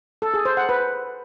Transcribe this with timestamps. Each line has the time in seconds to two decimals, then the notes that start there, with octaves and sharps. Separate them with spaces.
0.22 A4
0.34 G#4
0.45 C5
0.57 F#5
0.69 B4